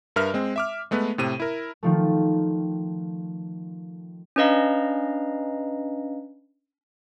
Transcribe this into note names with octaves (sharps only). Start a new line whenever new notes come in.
G2 A#4 B4 E5 F6
G#3 C4
E5 D6 F6
G#3 A3 B3 B4
A2 C3 D#7
E4 A#4
D#3 F3 A3
C#4 D4 B4 D#5 F5 A#5